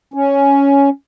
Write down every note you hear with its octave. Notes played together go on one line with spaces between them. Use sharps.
C#4